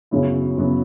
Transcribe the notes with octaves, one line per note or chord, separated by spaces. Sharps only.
F#2 C#3 F#3 B3 E4
F#2 C#3 F#3 B3 E4